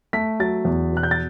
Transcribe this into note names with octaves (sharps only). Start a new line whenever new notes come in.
A3 B6
F#3 A6
E2
B2 F#6
G6
A6